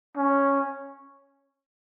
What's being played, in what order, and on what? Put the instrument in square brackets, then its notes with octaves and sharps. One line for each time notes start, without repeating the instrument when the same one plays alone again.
[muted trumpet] C#4